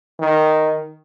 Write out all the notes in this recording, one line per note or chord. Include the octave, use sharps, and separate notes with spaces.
D#3